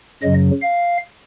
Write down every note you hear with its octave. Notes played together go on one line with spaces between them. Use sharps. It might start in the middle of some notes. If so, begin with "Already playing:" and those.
F#2 C#3 F#3 D#5
F5